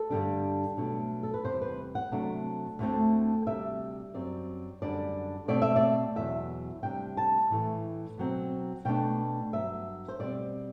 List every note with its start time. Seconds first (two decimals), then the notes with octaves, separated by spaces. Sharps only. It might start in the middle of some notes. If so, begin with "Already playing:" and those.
Already playing: A4
0.10 G2 D3 G3 D4
0.77 B2 F#3 A3 D4
1.23 A4
1.34 B4
1.44 E2 C3 G3 C5
1.62 B4
1.95 F#5
2.12 C3 F#3 A3 D4
2.79 D2 D3 A3 C4
3.46 D2 C3 G3 E5
4.14 F#2 F#3 C4 D5
4.82 F#2 D3 G3 D4 D5
5.48 B2 A3 C4 D5
5.62 E5
5.76 D5
6.16 E2 B2 F#3 E5
6.83 C3 G3 D4 G5
7.17 A5
7.50 A2 E3 A3
8.17 B2 F#3 C4
8.85 B2 A3 D4 G5
9.53 G2 F#3 B3 E5
10.08 C5
10.19 B2 G3 C4 D5